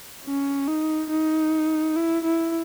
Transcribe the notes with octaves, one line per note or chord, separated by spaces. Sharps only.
C#4
D#4
D#4
E4
E4